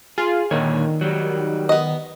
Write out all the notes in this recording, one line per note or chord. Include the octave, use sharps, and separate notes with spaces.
F4 G#4
A#2 D3 D#3 C#5
F#3 G3
B3 D#5